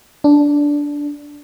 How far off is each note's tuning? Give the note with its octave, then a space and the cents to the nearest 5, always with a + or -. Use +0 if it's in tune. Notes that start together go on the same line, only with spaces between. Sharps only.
D4 -10